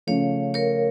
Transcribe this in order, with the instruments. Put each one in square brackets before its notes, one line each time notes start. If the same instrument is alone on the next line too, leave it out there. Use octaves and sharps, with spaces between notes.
[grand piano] C#3 F3 A3 [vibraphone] C#5 F5
[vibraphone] A#4 C#5